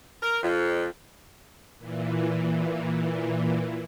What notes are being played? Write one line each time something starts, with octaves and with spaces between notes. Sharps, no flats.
A#4
F2
A#2 E3